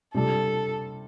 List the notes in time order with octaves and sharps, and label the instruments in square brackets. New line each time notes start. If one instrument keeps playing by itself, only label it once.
[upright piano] C3 G3 D4 [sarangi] A4